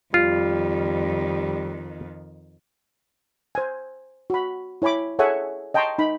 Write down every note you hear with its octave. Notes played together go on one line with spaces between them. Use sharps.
F2 D#3 G3 F4
C5 G#5
F#4 B5
E4 C#5 G#5 B5 D6
G#4 A4 C#5 E5 F#5 G#5
D#5 G5 A5 A#5 C6 C#6
D#4 B5